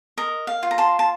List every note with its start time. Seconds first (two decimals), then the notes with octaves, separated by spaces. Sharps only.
0.17 A#4 D#5
0.47 F5
0.63 F4
0.71 A#5
0.78 A5 C6
0.99 A5